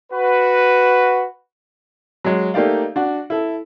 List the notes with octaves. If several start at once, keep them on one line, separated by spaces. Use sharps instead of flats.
F#4 B4
F#3 G#3
A3 A#3 D#4 G4 D5 F5
D4 F#4
E4 A4